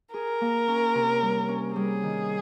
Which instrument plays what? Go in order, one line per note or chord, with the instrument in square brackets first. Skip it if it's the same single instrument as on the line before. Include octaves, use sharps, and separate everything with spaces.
[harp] G#4 [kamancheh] A#4
[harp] A#3
C#4
C3
G3
C#4
[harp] G3 [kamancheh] G#4
[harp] D#3